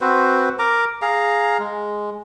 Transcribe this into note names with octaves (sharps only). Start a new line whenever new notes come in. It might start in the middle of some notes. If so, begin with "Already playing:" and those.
C4 F#4 B4 C5
A#4 A#5 D6
G#4 F5 A#5
G#3